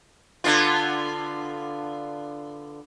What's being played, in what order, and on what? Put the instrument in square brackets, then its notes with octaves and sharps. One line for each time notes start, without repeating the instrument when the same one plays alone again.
[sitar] D3 B3 F4